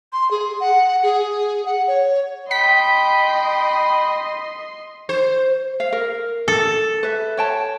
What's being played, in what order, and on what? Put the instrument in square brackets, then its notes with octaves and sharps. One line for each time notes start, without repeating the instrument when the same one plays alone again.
[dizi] C6
G#4
F#5
G#4
F#5
C#5
[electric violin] D#5 C6 [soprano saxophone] G5 [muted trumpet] B5 [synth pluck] B6
[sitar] C5
[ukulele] F5
A#4
[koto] A4
[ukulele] B4 E5
C#5 G5 A5